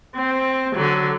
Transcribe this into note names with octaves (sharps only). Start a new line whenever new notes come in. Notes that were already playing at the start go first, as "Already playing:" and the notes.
C4
D3 F#3